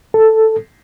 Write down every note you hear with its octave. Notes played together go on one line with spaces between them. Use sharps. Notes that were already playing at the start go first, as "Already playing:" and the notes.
A4